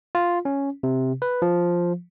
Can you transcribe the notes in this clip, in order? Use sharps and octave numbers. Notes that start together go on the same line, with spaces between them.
F4
C#4
C3
B4
F3